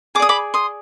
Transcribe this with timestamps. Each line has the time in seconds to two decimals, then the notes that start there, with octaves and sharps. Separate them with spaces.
0.15 G#4 D6
0.20 D5 D#6
0.29 B5 D6
0.54 C6 D#6